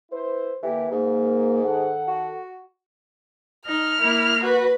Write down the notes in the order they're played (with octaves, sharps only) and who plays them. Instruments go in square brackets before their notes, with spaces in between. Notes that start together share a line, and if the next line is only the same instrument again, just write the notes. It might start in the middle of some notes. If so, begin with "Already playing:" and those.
[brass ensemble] E4 B4 C5
[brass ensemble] D3 A#3 G4 [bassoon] E3
[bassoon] G#2 [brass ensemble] A#3
[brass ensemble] D#3 A4 F#5
[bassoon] F#4
[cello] D#4 [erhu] F6
[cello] A#3 E4
[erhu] F#4 [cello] B4